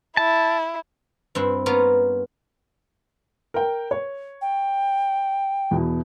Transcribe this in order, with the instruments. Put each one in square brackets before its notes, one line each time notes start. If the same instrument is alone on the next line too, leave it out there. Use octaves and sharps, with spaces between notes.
[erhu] E4 [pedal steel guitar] A5
[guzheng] G2 C4 E4
A#3 B3 C#4 F4 A#4 C#5
[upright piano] A#4 G5
C#5
[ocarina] G5
[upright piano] E2 B2 E3